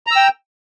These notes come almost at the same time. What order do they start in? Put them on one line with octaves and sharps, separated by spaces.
A#5 E6 G5